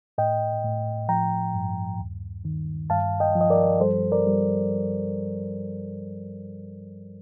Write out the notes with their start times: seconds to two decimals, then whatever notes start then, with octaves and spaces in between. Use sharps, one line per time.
0.18 A2 D#5 G5
0.64 A2
1.09 F3 G5 A#5
1.54 G2
1.99 D#2
2.45 D#3
2.90 G2 F5 A5
3.20 D#5 G5
3.35 F3
3.41 D#5
3.50 A#4 D5
3.80 G3 A4 C5
4.12 A#4 D5
4.27 G3